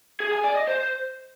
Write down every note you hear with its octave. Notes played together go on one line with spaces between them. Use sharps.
G#4
G#5
D5
D#5
C5